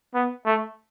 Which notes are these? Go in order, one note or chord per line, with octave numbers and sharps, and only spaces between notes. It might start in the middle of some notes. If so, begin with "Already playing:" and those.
B3
A3